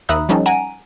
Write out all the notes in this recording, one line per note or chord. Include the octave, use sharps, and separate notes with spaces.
D#2 E5 A#5 B5 D#6 F#6
F3 G3 C#4 D#4 A4
F#5 G#5 A#5 D7 D#7